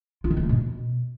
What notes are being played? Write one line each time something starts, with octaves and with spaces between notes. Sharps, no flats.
F4
D#3
G#3
A3
B2